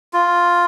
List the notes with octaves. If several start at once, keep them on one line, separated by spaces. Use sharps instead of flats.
F4